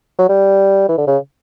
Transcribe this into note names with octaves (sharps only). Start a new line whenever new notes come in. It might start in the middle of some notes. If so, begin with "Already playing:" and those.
F#3
G3
E3
D3
C#3